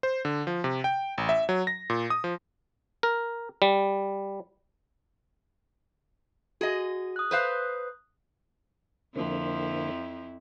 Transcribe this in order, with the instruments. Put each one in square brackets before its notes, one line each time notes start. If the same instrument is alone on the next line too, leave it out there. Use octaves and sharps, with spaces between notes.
[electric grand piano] C5
D3
F3
C3
G5
A1
E5
F#3
A#6
A#2
D#6
F3
[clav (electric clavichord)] A#4
G3
[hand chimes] F#4 [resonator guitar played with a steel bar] G#4 D#5
[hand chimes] D#6 F#6
[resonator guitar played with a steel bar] B4 C5 F5
[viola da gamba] F2 F3 E4 [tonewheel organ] D3 A#3 C4